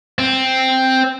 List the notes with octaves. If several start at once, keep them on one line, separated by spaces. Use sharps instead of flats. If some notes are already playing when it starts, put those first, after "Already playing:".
C4